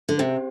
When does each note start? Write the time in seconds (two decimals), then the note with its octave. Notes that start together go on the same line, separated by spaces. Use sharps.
0.09 D3
0.18 C3 C4 G4 C5 G5